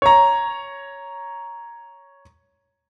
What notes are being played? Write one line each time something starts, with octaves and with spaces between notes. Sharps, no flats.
C#5 A#5